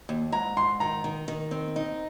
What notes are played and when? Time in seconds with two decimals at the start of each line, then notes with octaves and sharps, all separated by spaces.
0.09 D#2
0.32 G#2 A#5
0.57 G#2 C6
0.80 D#3 A#5
1.04 D#3
1.28 D#3
1.51 C4
1.76 D#4